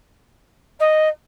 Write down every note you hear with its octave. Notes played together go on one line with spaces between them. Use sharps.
D#5